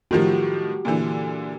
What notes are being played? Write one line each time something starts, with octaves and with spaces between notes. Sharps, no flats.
A2 D#3 F3 F#4 G4
A#2 D3 E3